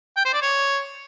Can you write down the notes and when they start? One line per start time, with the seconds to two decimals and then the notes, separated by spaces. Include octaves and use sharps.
0.17 G5
0.25 C5
0.34 D5
0.42 C#5